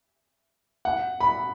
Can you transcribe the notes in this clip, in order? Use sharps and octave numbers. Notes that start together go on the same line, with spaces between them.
F#5
B5